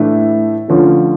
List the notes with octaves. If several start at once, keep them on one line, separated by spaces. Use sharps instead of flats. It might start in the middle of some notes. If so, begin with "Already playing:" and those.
Already playing: A2 E3 A3 D4
D2 D3 F3 C#4 F4